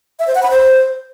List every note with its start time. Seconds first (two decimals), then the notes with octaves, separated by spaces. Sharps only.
0.20 E5
0.27 C5
0.35 F#5
0.43 B5
0.51 C5